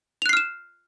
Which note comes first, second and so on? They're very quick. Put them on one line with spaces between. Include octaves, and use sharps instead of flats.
F7 F#6 C7 F6 E7